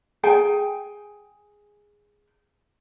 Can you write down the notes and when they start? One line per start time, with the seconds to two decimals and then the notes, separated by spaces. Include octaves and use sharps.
0.23 G#4 G5 G#5